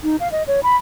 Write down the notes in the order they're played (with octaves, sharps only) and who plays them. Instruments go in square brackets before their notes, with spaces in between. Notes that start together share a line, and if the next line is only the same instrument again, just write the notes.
[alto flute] D#4
F5
D#5
C#5
B5